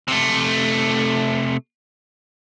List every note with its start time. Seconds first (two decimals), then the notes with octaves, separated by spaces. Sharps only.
0.08 C3 A3